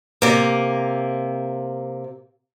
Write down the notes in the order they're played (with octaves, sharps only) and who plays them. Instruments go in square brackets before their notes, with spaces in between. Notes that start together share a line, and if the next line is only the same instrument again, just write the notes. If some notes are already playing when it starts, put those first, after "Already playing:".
[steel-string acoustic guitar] C3 A#3